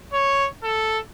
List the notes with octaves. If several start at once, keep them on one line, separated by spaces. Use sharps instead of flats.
C#5
A4